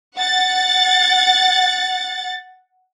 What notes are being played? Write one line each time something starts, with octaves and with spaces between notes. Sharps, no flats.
F#5 A6